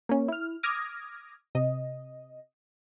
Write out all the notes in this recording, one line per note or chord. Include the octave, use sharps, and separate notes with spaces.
A#3 C#4
E4 F6
D6 D#6 F6 G#6 A#6
C3 D#5